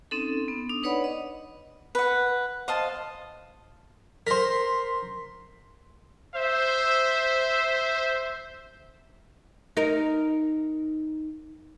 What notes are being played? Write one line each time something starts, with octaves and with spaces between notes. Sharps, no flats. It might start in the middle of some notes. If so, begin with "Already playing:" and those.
C4 C#4 D#4 A4
B3
D4 D#6
D#4 B4 C#5 D5 F#5 B5
D#5
B4 F#5
C5 D#5 F5 A5
A#4 C5 C6 B6
C5 E5
D#4 A#4